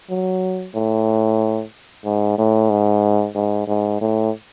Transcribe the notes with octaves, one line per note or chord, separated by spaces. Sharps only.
F#3
A2
G#2
A2
G#2
G#2
G#2
A2